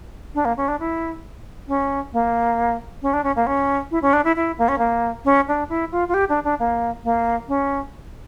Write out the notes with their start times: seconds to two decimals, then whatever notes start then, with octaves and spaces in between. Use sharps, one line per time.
0.35 D4
0.45 A#3
0.57 C#4
0.68 D4
0.80 E4
1.68 C#4
2.13 A#3
3.02 C#4
3.13 D4
3.24 C#4
3.36 A#3
3.47 C#4
3.91 E4
4.02 C#4
4.13 D4
4.24 E4
4.36 E4
4.58 A#3
4.68 C#4
4.78 A#3
5.25 C#4
5.48 D4
5.69 E4
5.92 F4
6.08 F4
6.14 G4
6.29 D4
6.44 D4
6.59 A#3
7.04 A#3
7.48 C#4